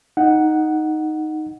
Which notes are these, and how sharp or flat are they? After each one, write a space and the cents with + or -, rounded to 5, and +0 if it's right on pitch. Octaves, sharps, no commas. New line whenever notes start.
D#4 +0 F#5 +0